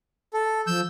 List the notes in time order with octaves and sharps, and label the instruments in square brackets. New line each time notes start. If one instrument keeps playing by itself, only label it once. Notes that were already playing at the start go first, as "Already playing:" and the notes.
[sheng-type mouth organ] A4
[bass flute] F3 [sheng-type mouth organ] E6 G6